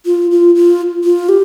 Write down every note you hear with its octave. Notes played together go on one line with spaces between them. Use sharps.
F4
F4
F4
F4
G4